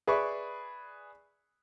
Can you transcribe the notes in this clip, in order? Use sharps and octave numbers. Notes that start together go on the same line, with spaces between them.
G#4 B4 D5 E5 B5 C#6